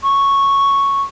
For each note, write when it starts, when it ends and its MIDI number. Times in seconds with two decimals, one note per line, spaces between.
0.03 1.02 85